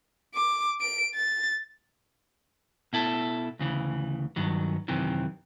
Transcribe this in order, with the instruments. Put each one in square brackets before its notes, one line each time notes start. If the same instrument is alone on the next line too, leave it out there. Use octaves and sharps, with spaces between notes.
[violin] D6
D7
A6
[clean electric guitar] B2 E4 A4
D2 C#3 E3
G2 D#3 F#3
F#2 C3 D#3 E3